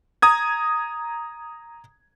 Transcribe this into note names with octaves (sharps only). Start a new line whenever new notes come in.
A#5 D#6 G#6